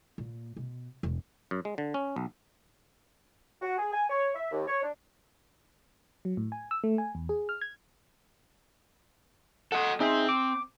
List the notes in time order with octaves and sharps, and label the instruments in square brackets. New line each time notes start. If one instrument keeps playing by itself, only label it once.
[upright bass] A#2
B2
E1
[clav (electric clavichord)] F#2
G#3
D3
C#4
B1
[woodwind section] F#4
G#4
G#5
C#5
E5
D#2
C#5
D4
[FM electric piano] F#3
A2
G#5
E6
A3
G#5
E2
G#4
F6
G#6
[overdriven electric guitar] A4 D#5 [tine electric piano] F#5
[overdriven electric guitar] C4 [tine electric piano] D#4 G#4 E5
[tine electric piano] D6